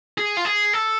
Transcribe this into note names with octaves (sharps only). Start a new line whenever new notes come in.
G#4
F4
G#4
A4